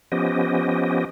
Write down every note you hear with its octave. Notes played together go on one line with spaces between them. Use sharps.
F3 B3 C#4 G4 D#5